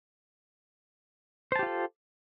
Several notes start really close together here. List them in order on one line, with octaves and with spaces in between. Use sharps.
C5 A5 G4 F4 A4